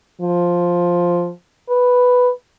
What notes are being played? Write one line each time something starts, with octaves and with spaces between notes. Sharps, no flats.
F3
B4